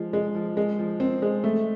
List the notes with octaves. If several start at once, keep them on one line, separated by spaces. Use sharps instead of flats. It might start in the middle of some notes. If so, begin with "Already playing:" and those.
Already playing: F3 G#3
G#3
F3
G#3
F3
C4
G#3
A3